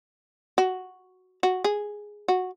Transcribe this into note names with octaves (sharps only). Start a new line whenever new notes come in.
F#4
F#4
G#4
F#4